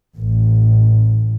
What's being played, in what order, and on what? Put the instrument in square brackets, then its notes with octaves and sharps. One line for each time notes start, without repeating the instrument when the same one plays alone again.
[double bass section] A1